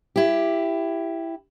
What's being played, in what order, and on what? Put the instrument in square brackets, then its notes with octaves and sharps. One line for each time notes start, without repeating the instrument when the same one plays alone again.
[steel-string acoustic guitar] E4 G4